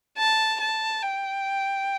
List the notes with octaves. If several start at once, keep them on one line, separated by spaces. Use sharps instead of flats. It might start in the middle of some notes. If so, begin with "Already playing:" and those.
A5
A5
G5